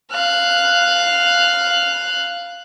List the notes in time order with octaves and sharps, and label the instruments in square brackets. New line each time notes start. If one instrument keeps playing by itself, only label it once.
[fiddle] F5 F#6